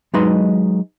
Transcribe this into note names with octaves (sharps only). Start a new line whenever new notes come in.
F#3 G#3 D#4 B4 D#5 C6